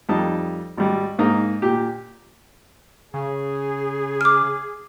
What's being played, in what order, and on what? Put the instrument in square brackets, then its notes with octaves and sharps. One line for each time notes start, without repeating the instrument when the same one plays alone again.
[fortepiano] F2 G3 D#4 A5
G#1 G3
G#2 A#3 D#4
A#2 G4
[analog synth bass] C#3 [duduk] G#4
[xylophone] D6 F6